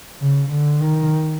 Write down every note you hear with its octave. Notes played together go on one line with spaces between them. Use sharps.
C#3
D3
D#3